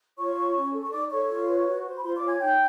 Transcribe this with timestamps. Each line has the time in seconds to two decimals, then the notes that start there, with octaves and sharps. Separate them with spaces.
0.17 F4 C#5 C#6
0.35 C#5
0.54 C#4
0.73 A4
0.83 C#6
0.92 D#4 D5 D6
1.10 A4 C#5 C#6
1.29 F4
1.47 B4
1.66 F#4
1.84 C5
1.98 B5
2.03 F4 C5 C6
2.16 D5 D6
2.22 C#5
2.28 G#5 G#6
2.40 D#4 G5 G6